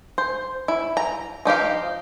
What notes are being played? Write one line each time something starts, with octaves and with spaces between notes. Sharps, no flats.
C5
E4
A#5
F3 D#4 G4 F5